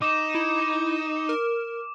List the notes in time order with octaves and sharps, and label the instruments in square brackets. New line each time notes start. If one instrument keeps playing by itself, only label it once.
[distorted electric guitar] D#4 [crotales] D6 E7
[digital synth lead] E4
A#4